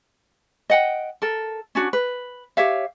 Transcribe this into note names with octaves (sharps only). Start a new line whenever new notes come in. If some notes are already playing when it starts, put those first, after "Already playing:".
D#5 F#5 G5
A4 A#4
C#4 D4 F#4
B4
G4 C#5 E5 F5